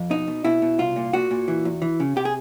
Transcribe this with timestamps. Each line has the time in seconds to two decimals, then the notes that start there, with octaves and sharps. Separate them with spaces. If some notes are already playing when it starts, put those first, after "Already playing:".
Already playing: F2
0.10 B2 D#4
0.27 B2
0.45 B2 E4
0.62 B2
0.78 C2 F4
0.96 A#2
1.13 A#2 F#4
1.31 A#2
1.48 E3
1.65 E2
1.82 E3
2.00 C#3
2.16 C3 G4
2.25 G#4